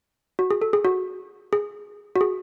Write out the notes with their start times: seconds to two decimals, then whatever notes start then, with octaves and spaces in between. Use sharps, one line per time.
0.39 F#4
0.51 G#4
0.61 A4
0.73 G#4
0.85 F#4
1.53 G#4
2.16 F#4
2.21 G#4